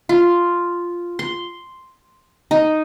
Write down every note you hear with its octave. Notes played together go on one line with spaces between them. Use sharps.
F4
C6
D#4